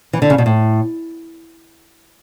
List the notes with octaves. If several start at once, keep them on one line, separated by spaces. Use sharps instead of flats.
E3
D3
C#3
B2
A2